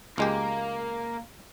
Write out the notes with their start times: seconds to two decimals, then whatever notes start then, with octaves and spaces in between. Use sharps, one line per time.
0.18 C#2 G#3 A#3 G4